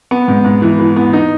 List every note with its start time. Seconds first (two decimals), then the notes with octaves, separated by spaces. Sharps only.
0.11 B3
0.28 G#2
0.44 G#2
0.62 E3
0.79 E3
0.96 B3
1.13 D#4